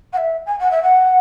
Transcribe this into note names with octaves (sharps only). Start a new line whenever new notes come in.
F#5
E5
G#5
F#5
E5
F#5